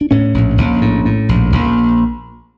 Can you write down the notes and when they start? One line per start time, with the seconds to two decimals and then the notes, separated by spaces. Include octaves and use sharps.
0.01 D4
0.11 A2 C#4
0.34 A#1
0.58 A#1
0.81 A2
1.05 A2
1.29 A#1
1.52 A#1